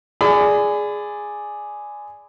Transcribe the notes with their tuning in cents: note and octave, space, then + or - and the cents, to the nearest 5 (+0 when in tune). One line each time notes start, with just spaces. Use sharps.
G#4 +0 D5 +0 B5 +35